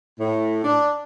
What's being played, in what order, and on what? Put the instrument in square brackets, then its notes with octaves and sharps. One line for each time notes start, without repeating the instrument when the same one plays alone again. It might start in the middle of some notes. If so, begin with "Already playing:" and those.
[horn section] A2
D4